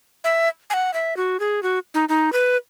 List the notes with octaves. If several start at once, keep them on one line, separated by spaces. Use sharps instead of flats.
E5
G#5
F#5
E5
F#4
G#4
F#4
D#4
D#4
B4